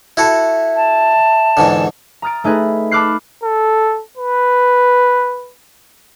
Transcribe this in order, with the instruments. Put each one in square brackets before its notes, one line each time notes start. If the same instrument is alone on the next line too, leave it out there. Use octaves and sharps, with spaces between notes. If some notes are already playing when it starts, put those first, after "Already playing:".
[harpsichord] E4 F#4 A4 [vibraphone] E5
[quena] A5
[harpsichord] E2 G#2 D3
[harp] A#5 D#6 F6 A6 D7
A3 D#4 G#4 B4
A5 B5 D6 F6 F#6 C7
[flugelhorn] A4
B4